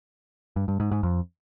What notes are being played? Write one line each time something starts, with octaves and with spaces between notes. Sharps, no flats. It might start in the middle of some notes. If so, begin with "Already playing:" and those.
G2
G2
G#2
G#2
F2